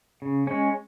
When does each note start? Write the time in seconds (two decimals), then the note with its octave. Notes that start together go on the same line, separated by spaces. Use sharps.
0.22 C#3
0.47 G#3 C#4